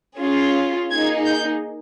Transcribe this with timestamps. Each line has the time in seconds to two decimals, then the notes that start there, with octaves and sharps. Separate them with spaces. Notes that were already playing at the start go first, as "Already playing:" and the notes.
0.20 C#4 F4 G#4
0.91 A#3 D#4 G#4 G#6
1.27 G6